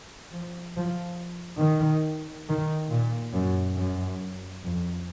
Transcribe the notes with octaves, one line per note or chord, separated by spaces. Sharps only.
F3
F3
D#3
D#3
A#2
F#2
F#2
F2